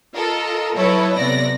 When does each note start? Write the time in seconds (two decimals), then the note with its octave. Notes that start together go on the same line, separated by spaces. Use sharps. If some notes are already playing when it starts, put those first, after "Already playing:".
0.14 F4 A4 A#4 D#5
0.75 F#3 E4 A4 B4 C#5 D#5
1.14 C3 B3 D5 A#6